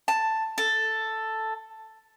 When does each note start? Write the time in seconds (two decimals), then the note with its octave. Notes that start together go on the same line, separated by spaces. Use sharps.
0.08 A5
0.58 A4